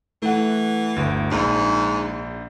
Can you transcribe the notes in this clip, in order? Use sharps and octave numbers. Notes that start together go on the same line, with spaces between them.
E3 A3 F#5
G1 D2
A#1 G#2 F3